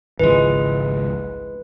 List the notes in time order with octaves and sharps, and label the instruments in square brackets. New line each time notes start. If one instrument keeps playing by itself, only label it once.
[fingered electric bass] G#1 C#2 F3 [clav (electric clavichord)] E3 G#3 [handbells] B4